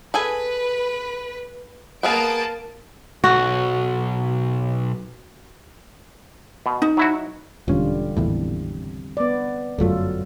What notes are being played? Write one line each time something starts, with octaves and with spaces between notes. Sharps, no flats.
G#4 A4 B4 G#5
A#3 B3 G#4 F5 A5 D7
B1 F#4
B2
D#4
F#3 E4 F#4
E1 D3 G3 C#4 F4
G#1 E2 A2 C3
B3 D5
G1 F#2 F#3 A3 F4 A4